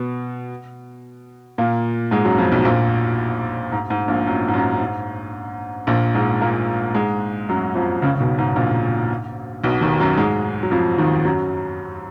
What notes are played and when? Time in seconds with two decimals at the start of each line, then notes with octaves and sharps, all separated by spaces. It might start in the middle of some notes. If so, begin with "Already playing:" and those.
Already playing: B2 B3
1.58 A#2 A#3
2.11 G#2 G#3
2.25 F#2 F#3
2.38 F2 F3
2.52 B1 B2
2.65 A#1 A#2
3.72 G#2
3.90 G#2
4.08 A#1 A#2
4.27 F#2
4.48 G#2
4.54 F#2
4.80 G#2
5.87 A#1 A#2
6.14 G#2 G#3
6.41 A#2 A#3
6.95 G#2 G#3
7.49 F#2 F#3
7.75 F2 F3
8.02 C#2 C#3
8.15 C#3
8.20 B1 B2
8.38 G#2
8.56 A#1 A#2
9.64 B1 B2
9.81 D#2 D#3
10.00 F#2 F#3
10.17 G#2 G#3
10.63 F#3
10.71 F2 F3
10.98 D#2 D#3
11.25 F#2 F#3